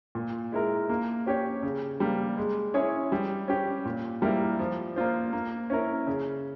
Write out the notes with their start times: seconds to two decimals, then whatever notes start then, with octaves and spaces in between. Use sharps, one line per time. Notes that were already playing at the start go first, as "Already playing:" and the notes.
0.15 A#2
0.52 G#3 E4 A#4
0.90 A#3
1.26 C#4 G4 C#5
1.63 C#3
2.00 G3 A#3
2.37 G#3
2.74 C#4 E4 G#4 C#5
3.12 G3
3.48 C#4 G4
3.85 A#2
4.22 G3 A#3 E4 A#4
4.59 F3
4.96 A#3 F4 C5
5.33 A#3
5.70 C#4 E4 A#4
6.07 C#3